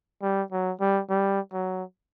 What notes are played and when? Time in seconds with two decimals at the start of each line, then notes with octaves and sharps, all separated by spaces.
0.22 G3
0.52 F#3
0.81 G3
1.10 G3
1.53 F#3